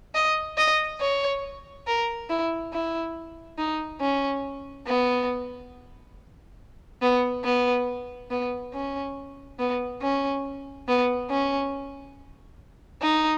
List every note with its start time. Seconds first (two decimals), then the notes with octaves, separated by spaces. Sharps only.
0.15 D#5
0.57 D#5
1.01 C#5
1.87 A#4
2.29 E4
2.73 E4
3.58 D#4
4.01 C#4
4.87 B3
7.02 B3
7.44 B3
8.30 B3
8.73 C#4
9.59 B3
10.02 C#4
10.88 B3
11.30 C#4
13.02 D#4